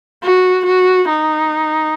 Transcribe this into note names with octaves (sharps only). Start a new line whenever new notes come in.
F#4
F#4
D#4